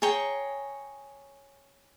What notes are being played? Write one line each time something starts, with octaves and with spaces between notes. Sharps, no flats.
G#4 C#5 G5 A#5